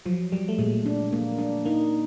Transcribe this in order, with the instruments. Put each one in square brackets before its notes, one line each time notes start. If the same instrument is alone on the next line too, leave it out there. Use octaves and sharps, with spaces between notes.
[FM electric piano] F3 [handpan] F#3
[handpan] F#3 [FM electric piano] G3
[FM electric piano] A3
[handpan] A#2 [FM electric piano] G#3
[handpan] D4
A#3
D4
[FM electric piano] A#3 [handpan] D#4